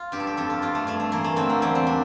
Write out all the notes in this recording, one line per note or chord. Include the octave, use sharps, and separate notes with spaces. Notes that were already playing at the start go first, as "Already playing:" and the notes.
Already playing: F4
G2 G4
A4
G4
F2 A4
F4
F2 F4
A3
G2 A3
A3
E3 A#3
A3
D3 C4
A#3
E2 G3
C4
D4